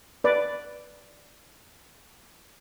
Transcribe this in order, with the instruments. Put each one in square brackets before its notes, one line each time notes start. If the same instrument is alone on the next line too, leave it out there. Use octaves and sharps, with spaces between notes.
[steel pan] B4 D5